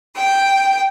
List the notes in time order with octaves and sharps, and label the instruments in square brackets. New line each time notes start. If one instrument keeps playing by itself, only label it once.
[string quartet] G5